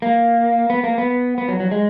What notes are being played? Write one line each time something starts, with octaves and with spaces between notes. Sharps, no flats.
A#3
B3
A#3
B3
B3
F#3
F#3
G#3